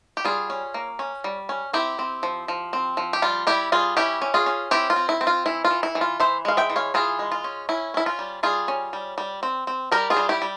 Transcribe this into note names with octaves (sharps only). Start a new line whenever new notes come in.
G4
G3 F4 G#4
C#4
A#3
C#4
G3
C#4
C4 E4 G4
C4
F3
F3
C4
F3
G4
G3 F4
G3 E4 G4
G3 F4 G#4
C#4 E4 G4
C#4
F4 G#4
C#4
C4 E4 G4
F4
C4
E4
C4
F4
E3 E4
F4
E3
E4
E3
F4
E3 C5 E5
G#3 F5
E5 G5
E3
C#5 F5
E3 F4 G#4
G#3
F4
C#4
C#4 E4
C#4 E4
F4
G3
G3 F4 G#4
C#4
G3
G3
C4
C4
G3 G4 A#4
F4 G#4
G3
E4 G4
G3